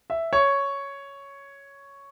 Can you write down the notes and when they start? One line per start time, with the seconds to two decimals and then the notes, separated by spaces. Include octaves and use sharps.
0.10 E5
0.33 C#5